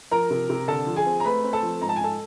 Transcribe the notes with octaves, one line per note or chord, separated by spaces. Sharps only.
F3 A#4 A#5
C3
C3
D3 A4 A5
F3
G#4 G#5
C4
A#5
A3 B4 B5
C4
A4 A5
F3
G#2 A#5
A5
G#5
G#2 A4 A5